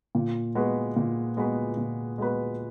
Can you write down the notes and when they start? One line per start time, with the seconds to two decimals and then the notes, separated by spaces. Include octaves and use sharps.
0.15 A#2
0.55 G#3 B3 F#4 B4
0.96 A#2
1.37 G#3 B3 F#4 B4
1.77 A#2
2.18 G#3 B3 F#4 B4